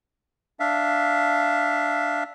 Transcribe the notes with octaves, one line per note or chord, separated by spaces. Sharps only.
D4 E5 F5